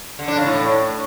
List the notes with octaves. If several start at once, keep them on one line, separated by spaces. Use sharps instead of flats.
D3
D4
C#3
A2